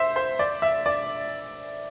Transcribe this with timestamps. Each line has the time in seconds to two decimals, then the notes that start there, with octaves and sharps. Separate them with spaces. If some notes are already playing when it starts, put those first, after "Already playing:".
Already playing: C5 E5
0.16 C5
0.39 D5
0.62 E5
0.86 D5